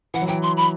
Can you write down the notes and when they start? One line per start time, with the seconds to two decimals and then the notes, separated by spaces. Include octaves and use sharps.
0.14 E3 F#5
0.22 F#3
0.28 E3 G5
0.42 C6
0.57 B5